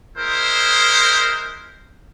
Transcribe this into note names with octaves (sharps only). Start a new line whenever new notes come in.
G#3 E4 A#4 C5